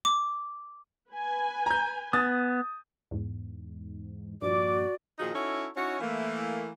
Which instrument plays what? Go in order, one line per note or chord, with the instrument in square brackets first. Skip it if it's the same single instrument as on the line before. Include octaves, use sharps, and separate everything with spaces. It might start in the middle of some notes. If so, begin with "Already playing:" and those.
[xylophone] D6
[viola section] B4 G#5
[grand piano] A#5 G6
[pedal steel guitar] B3 [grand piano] D#6 A6
[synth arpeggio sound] E2 G#2
[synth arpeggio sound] G2 A#2 F3 [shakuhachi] F#4 [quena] D5 [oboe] D6
[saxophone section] A#2 D#3 F3 D#4 F#4 G#4
C#4 D#4 E4 F#4 A4 C#5
C#4 D#4 E4 F#4 C#5
E3 A3 A#3